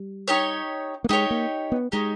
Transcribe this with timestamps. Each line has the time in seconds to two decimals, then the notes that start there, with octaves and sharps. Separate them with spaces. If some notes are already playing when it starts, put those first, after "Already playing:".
Already playing: G3
0.28 D#4 G4 C#5
1.04 A#3
1.09 G#3 D#4 G4 C#5
1.30 A#3
1.72 B3
1.92 G#3 D#4 G4 C#5